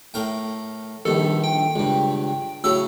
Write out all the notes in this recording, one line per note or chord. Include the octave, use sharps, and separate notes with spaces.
A2 A#4 G5
A#1 G2 D#3 A4
G5
C#2 G2
A2 C#3 F#3 E6